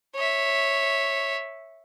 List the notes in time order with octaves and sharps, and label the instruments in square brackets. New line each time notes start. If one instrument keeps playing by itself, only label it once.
[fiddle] C#5 E5